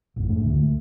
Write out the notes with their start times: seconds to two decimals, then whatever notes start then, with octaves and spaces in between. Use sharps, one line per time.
0.16 A1 F2
0.29 G#2 A3 D4
0.44 D1 C#2 D3 A3
0.63 A3